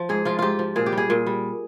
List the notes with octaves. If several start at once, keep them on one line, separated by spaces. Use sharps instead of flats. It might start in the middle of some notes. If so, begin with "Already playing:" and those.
Already playing: F3
G#2 G#4
F3 F4
G#2 F4 G4
F3
A#2 G#4
G4
G3
G#4
A#2
G3